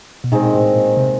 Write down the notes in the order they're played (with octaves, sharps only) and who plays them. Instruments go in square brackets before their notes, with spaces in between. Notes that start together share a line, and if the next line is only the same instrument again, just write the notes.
[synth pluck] B2
[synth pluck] A#2 [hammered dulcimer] D#3 G#3 C4
[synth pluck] A2
A#2
C3